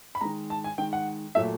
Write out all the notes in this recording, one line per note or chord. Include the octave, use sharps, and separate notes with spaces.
B5
D#3 G#3 A#5
A5
G#5
D#3 G#3 G5
F#5
A#2 F#3 A3 E5